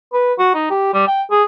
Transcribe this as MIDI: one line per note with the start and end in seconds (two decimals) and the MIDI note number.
0.13 0.34 71
0.38 0.50 66
0.54 0.66 63
0.71 0.92 67
0.94 1.06 55
1.07 1.22 79
1.31 1.44 68